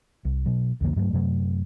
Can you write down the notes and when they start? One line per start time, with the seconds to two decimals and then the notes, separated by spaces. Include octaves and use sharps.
0.25 C2
0.46 B2 F#3
0.81 C2 F2 D3 A#3
0.96 G2 F#3 G3 A3
1.13 F#2 C3 F#3 A3